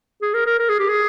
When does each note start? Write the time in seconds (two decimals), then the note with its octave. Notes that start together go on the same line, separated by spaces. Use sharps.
0.22 G#4
0.34 A#4
0.46 A#4
0.59 A#4
0.69 G#4
0.79 G4
0.89 G#4